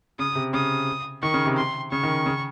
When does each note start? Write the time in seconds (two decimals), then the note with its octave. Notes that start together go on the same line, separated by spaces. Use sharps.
0.19 C#3 D#6
0.35 C3
0.53 C#3 D#6
1.23 D#3 C#6
1.34 C#3
1.46 C3
1.57 C6
1.91 C#3 C#6
2.03 D#3
2.26 C#3